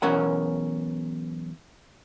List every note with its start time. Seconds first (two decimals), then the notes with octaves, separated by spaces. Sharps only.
0.02 B1 E2 C#4 A#4 F#5